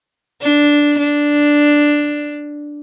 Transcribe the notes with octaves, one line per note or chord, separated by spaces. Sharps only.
D4
D4